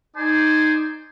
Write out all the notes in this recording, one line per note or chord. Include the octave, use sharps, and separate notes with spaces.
D#4 C5 D5 G#5